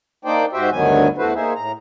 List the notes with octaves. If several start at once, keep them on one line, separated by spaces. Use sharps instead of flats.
A#3 D4 D#4 C5 D5 G5
G#2 F#4 G4 C5 E5 G5
D2 G2 D#3 F#3 B3 G#5
E2 A3 E4 F#4 B4 C5
A#3 D#4 G#4 C5 E5
A2 A#5